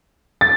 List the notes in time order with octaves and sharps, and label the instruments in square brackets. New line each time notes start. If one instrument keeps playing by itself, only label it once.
[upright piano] A6